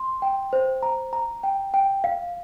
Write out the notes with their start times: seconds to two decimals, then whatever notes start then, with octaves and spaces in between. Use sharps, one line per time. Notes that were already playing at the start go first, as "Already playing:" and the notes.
Already playing: C6
0.22 G5
0.53 C5
0.83 A#5
1.13 A#5
1.43 G5
1.74 G5
2.04 F5